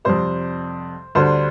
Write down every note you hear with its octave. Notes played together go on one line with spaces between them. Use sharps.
F2 C3 G3 C5
D2 D3 G3 C5